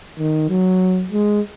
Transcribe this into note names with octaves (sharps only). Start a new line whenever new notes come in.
D#3
F#3
G#3